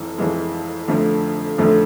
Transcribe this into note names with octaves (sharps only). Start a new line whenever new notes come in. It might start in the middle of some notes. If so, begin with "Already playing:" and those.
Already playing: F1 F2 E3 G#3
F1 F2 E3 G#3
F1 F2 D3 F3 A3
F1 F2 D3 F3 A3